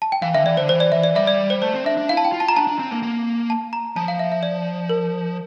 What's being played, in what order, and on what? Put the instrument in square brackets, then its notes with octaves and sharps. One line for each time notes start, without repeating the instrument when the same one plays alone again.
[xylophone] A5
G5
[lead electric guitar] E3 [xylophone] F5
[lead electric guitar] D3 [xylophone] E5
[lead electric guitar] E3 [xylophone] D5
[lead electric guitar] D3 [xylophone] C5
[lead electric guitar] E3 [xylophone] C5
[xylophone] D5
[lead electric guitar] E3 [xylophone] E5
[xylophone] D5
[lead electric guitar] G3 [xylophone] E5
[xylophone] D5
C5
[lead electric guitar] A3 [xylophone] C5
[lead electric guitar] C4
[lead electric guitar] D4 [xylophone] E5
[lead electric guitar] D4
[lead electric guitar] E4 [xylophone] F5
[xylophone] A5
G5
[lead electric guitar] F4
[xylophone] A5
A#5
[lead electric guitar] D4 [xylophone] A5
[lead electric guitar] D4
C4
A#3
A#3
[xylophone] A5
A#5
[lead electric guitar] F3 [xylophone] A5
[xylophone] F5
E5
E5
D5
A#4